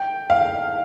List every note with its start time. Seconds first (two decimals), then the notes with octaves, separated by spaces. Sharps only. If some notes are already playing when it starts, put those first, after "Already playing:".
Already playing: G5
0.30 F5